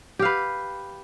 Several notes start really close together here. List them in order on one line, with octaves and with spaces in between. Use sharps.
G4 F5 B4